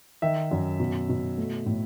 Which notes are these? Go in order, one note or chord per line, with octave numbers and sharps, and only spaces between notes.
D#3 E5
F#2
B2
B2
A3
A2